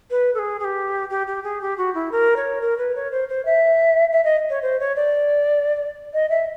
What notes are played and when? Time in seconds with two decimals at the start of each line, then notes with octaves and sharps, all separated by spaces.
0.11 B4
0.34 A4
0.39 G#4
0.60 G#4
0.64 G4
1.10 G4
1.27 G4
1.44 G#4
1.61 G4
1.78 F#4
1.94 E4
2.12 A#4
2.36 C#5
2.61 A#4
2.78 B4
2.95 C#5
3.11 C5
3.29 C5
3.45 E5
4.12 E5
4.24 D#5
4.50 C#5
4.62 C5
4.80 C#5
4.96 D5
6.14 D#5
6.30 E5